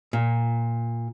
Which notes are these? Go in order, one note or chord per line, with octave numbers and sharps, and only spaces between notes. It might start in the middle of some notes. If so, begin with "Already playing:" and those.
A#2